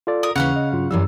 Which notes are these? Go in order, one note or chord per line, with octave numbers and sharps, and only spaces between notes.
F4 A4 D5
A#4 D#6
D#2 C#3 E3 C#4 F5 F#5
D#5
G2 F#3 F4
F#2 E3 G3 E6